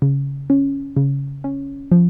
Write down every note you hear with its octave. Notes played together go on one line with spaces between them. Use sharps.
C#3
C#4
C#3
C#4
F3